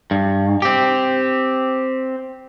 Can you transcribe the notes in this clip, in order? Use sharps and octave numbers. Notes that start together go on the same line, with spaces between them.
G2
C4 G4